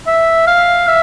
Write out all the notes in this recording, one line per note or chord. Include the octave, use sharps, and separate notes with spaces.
E5
F5
E5